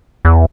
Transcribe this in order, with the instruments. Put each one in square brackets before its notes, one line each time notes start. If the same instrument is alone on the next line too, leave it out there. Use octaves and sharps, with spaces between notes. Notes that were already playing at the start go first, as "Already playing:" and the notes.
[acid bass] E2